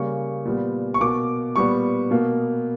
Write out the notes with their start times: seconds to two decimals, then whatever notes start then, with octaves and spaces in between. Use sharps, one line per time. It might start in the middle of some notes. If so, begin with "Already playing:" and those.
Already playing: C#3 G3 A#3 C#6
0.45 A#2 G3 B3
0.94 C#6
1.01 B2 A#3 D6
1.56 A#2 G3 B3 C#6
2.11 B2 A#3